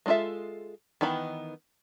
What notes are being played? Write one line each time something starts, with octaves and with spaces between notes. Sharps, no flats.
G#3 D4 F4 A4 E5
D#3 E3 B3 B5